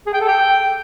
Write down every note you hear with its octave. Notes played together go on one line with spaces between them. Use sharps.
G#4
G5
A4
G5